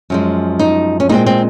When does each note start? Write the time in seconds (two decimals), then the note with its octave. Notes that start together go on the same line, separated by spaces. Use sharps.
0.10 F#2 F3 G#3
0.59 D#4
1.00 C#4
1.09 A#2 G#3 C4 D#4
1.26 C4